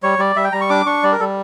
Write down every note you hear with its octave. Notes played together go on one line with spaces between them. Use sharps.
G3 C#5
G3 D5
G3 E5
G5
G3 A#5
C#6
D4 D6
D4 C#6
G3 D5
A#4
G3 A4